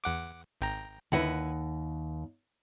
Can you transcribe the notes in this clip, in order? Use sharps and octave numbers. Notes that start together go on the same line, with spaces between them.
E2 F#5 D6
G#1 G5 A#5
D#2 D3 E4 B4 D#5 F#5